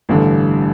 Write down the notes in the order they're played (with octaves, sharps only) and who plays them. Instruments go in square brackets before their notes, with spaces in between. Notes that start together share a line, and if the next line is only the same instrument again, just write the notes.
[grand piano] A1 G2 D3